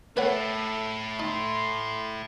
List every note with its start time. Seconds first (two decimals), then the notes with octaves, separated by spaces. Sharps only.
0.17 A3 E4 A4 B4 C#5 F#5
1.20 D#4 C6